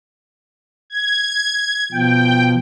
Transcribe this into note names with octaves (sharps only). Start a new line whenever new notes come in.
G#6
B2 F3 G5